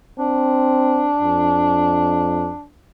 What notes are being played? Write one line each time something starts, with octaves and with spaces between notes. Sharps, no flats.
C4 D4
F2